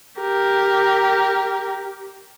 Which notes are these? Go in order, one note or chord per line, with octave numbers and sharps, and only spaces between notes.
G4 A#4